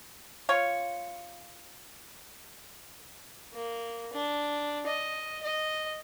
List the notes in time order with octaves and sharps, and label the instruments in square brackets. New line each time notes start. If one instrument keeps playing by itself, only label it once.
[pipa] F4 C#5
[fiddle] A#3
D4
D#5
D#5